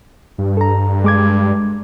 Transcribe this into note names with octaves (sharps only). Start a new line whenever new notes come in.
G2
A4 A#5
G#3 D6 G#6